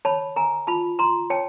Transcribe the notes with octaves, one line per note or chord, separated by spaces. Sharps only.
C#5 A5 B5
A#4 G#5 A#5
F4 A5 B5
F4 A#5 C6
C#5 G5 A5